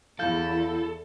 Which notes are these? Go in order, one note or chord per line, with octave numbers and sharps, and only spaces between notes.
E2 E4 A4 F5 G6